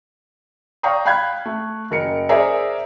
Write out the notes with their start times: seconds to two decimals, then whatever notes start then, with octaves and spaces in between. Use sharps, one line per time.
0.83 D5 F5 G5 A#5 C#6 D#6
1.06 F5 G5 B5 F#6 G#6
1.46 A3
1.91 F#1 A#4 C#7
2.29 G#4 A#4 C5 D5 E5 A#5